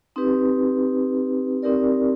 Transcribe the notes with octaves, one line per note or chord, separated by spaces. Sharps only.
C4 D#4 G4 B4
C4 D#4 G4 A#4 D5